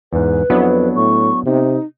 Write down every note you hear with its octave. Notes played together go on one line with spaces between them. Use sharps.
E2 G#2 B4
F2 F#3 B3 D4 E4
A2 C#6
C3 D#4